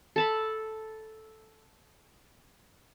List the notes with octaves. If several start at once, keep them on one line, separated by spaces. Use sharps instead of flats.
A4 A5 B5